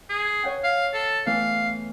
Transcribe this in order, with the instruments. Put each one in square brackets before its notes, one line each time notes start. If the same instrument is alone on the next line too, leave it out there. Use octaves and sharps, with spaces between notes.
[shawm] G#4
[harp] C#5 F#5 G5
[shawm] F5
A4
[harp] E3 A3 B3 [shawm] F5